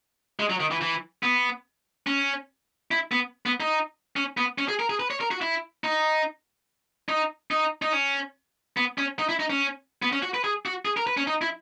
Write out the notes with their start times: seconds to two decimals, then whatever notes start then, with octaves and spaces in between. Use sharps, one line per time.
0.39 G#3
0.50 F#3
0.60 D#3
0.71 E3
0.81 E3
1.23 B3
2.07 C#4
2.91 E4
3.12 B3
3.46 B3
3.60 D#4
4.16 C#4
4.37 B3
4.58 C#4
4.68 G#4
4.80 A#4
4.90 G#4
5.00 B4
5.11 C#5
5.21 A#4
5.31 F#4
5.42 E4
5.84 D#4
7.09 D#4
7.51 D#4
7.82 D#4
7.93 C#4
8.77 B3
8.98 C#4
9.19 D#4
9.29 E4
9.40 D#4
9.50 C#4
10.02 B3
10.13 C#4
10.23 F#4
10.34 B4
10.44 G#4
10.66 F#4
10.85 G#4
10.97 A#4
11.07 B4
11.17 C#4
11.27 D#4
11.42 E4